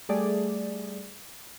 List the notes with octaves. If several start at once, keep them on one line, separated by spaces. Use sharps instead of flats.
G3 A3 G#4 D5